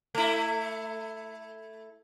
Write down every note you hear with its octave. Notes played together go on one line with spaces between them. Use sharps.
A3 E4